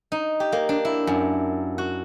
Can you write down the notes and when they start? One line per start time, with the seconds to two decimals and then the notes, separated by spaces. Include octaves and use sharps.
0.12 D#4
0.40 G4
0.52 A#3
0.69 D4
0.85 E4
1.07 F#2
1.78 F#4